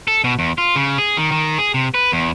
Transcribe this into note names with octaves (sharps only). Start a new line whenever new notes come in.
A4
B2
E2
F4
C#3
G#4
D#3
D#3
G#4
C3
B4
E2